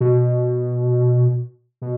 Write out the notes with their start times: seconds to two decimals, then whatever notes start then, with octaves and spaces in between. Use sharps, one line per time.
0.01 B2
1.82 B2